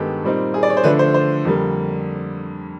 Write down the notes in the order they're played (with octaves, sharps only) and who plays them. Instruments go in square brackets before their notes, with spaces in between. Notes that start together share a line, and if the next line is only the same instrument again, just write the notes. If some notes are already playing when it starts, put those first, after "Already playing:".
Already playing: [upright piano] G2 D#3 G#3 B3 D#4 G4 A4
A#2 G3 C4 D#4
G#4
D5
C#5
C5
D3 F3 A3 D4 B4
C5
C5
F2 D3 G3 A#3